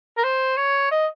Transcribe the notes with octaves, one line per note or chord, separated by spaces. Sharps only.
A#4
C5
C#5
D#5